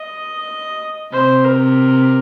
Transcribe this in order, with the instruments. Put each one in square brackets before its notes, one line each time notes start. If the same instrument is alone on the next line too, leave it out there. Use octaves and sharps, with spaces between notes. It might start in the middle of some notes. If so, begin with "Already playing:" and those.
Already playing: [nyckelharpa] D#5
[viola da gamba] C3 [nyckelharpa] C5
[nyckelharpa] A#4